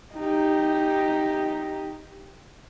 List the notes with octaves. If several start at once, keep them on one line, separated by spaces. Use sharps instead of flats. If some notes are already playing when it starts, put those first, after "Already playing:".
D#4 G4